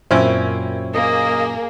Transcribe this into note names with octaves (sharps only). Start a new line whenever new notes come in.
F#2 A#2 C4 C#4 E4
A#3 G#4 D#5